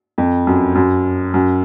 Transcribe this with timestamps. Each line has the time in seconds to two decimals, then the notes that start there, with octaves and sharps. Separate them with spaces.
0.18 F2
0.47 F#2
0.75 F#2
1.34 F#2